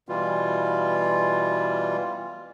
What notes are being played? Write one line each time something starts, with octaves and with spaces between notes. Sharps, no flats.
B2 E3 G3 F4